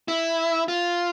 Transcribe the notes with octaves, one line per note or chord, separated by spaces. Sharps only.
E4
F4